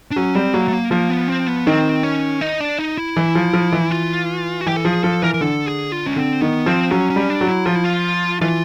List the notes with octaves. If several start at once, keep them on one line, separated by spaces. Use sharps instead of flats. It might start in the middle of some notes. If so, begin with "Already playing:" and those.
D4
F#3 C#4
G3 C4
F#3 A#3
A3
A#3
F3 A#3
B3
C4
B3
D#3 C4
C#4
D#4
D4
D#4
E4
E3
F3
F3
E3
F4
F#4
E3 G4
A4
F3 G#4
F3 A4
E3 A#4
A#4
D3 A4
G#4
F4
C#4
D3 C4
D#3 B3
F3 C4
F#3 C#4
C#4
G3
D4
F#3
E4
F3 F4
E4
F4
E3 F4